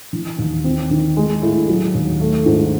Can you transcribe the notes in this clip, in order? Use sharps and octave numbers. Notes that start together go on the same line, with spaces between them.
E3
D#2
C4
D#3
G#3
A2
F#3
D#2
A3
G#2